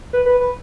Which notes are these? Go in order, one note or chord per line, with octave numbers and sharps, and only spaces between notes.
B4
B4
B4